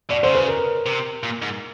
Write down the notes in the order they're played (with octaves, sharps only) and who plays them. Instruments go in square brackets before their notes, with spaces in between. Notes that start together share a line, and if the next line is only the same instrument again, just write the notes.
[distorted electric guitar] B2 [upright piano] D5
[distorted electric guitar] D3 [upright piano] C5
[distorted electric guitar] C#3
[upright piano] B4
A#4
[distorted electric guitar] C3
A#2
G#2